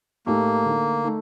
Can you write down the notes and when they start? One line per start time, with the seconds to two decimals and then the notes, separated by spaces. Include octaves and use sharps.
0.26 A2 A3 A#3 D#4 G4
0.65 D3 A3 D#4
1.04 A3 D#4